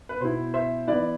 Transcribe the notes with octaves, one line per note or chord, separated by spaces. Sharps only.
B4
B2 B3 E4 C5
C5 E5
E3 B3 E4 B4 D5